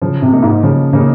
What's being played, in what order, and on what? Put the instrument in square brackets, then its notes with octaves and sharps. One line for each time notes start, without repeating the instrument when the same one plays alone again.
[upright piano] C#3 [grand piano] F3
[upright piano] C3
[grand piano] A#3 D#4
[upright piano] G#2
[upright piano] C#3 [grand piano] F3
[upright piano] C#3 [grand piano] A#3 D#4